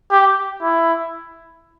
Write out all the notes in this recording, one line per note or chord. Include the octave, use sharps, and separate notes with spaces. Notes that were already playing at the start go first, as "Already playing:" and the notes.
G4
E4